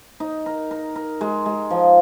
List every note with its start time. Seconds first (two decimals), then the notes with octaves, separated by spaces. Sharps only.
0.20 D#4
0.46 A#4
0.71 A#4
0.96 A#4
1.21 G#3
1.46 G#3
1.70 F3